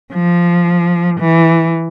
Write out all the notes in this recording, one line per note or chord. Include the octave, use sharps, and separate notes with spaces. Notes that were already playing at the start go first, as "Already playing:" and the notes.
F3
E3